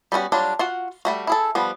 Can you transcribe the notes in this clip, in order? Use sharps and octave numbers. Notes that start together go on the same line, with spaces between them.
G3 B3 C#4 F#4
F#3 G3 D4 F4
F4 F#4 F#5
G3 A3 F#4
E4 G#4 A4
F3 G3 B3